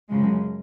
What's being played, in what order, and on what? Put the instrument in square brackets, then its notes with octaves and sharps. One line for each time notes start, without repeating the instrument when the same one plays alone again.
[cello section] F#2 C#3 F3 G#3